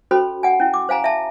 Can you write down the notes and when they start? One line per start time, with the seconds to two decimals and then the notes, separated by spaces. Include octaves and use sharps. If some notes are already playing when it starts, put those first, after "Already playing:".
0.11 C#4 F#4 A4 C5 B5
0.43 F#5 G#5
0.60 C#4 E4
0.74 D6
0.89 C5 F5 G#5 A#5
1.04 E5 A5